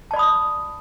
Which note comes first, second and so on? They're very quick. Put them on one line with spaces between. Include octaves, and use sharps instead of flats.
A5 D5 B5 D#6